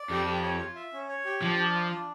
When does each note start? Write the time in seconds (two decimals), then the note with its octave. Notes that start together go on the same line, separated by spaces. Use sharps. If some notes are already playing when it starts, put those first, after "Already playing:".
Already playing: D5
0.10 F2 G4
0.26 G4
0.43 C#5
0.59 F4
0.75 E5
0.93 C#4
1.09 C#5
1.25 G4
1.42 F3 D4
1.58 D4
1.75 F4
1.92 D4